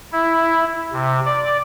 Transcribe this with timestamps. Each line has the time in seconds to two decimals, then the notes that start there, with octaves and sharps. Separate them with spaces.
0.12 E4
0.93 C3
1.26 D5